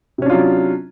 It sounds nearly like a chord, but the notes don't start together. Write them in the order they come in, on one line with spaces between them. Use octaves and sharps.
C3 C#4 D4 F4 F#3